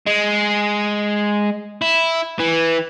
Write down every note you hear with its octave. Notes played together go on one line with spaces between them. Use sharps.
G#3
E4
E3